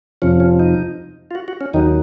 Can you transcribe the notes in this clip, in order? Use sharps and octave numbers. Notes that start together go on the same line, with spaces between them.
F2 C3 F3 C#4
C#4
D#4
F4
F#4
F#4
C#4
D#2 D#3 F#3 D#4